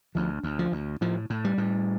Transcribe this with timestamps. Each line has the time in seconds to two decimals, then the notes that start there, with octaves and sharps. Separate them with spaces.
0.15 D2 F3
0.43 D2
0.59 F3
0.72 D2
1.01 A2 F3
1.30 A2
1.45 G3
1.58 A2